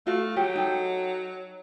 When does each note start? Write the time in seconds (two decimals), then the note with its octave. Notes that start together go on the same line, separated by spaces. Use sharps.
0.07 A3 F4 F#4 F5
0.36 F#3 G4
0.56 D#4 A4